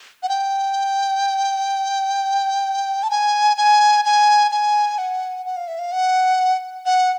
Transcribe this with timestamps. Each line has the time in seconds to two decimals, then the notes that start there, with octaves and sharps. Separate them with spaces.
0.23 F#5
0.29 G5
3.03 A5
3.10 G#5
3.57 G#5
4.05 G#5
4.51 G#5
4.98 F#5
5.46 F#5
5.57 F5
5.68 E5
5.79 F5
5.92 F#5
6.86 F#5